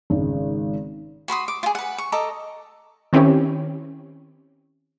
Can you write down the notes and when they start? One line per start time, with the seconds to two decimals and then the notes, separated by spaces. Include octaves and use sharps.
0.10 G#1 C#3 G#3
1.28 F#4 B5 C6 D#6
1.48 D6
1.63 F4 G#4
1.75 B4 F#5
1.98 C#6
2.12 A4 D#5 A#5 D6
3.13 D#3 C4 C#4 E4 G4 C#5